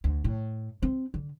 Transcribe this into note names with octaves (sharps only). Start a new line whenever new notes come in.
D2
A2
C4
D3